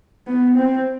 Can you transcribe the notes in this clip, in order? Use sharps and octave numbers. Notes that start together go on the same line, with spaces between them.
B3
C4